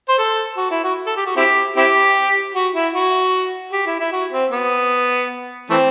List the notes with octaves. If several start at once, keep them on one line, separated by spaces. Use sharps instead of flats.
C5
A4
F#4
E4
F#4
A4
G4
F#4
C4 E4 G4
C4 E4 G4
F#4
E4
F#4
G4
E4
E4
F#4
C4
B3
E3 A3 C4